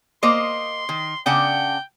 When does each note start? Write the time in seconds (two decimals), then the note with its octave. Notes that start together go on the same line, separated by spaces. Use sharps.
0.23 A#3 C5 D#5 C6
0.89 D#3
1.26 C#3 D4 F#5 G5